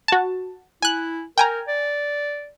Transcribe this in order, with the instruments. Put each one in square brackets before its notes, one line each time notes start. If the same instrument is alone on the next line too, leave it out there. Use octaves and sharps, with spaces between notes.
[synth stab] F#4 A5
[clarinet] E4 [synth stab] G#5 F#6
[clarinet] A#4 [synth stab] G5 G#5 A#5
[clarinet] D5